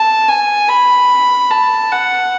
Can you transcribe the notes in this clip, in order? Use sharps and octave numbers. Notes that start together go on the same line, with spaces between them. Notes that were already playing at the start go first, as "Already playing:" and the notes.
Already playing: A5
G#5
B5
A5
F#5